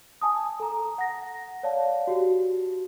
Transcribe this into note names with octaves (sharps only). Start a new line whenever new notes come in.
G#5 A5 D#6
A4 A#5
F#5 A#6
C#5 D5 F5 A5
F#4 G4